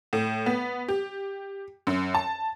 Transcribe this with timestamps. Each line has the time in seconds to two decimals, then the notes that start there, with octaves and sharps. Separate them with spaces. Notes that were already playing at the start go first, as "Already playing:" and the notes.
0.13 A2
0.46 B3
0.89 G4
1.87 F#2
2.15 A5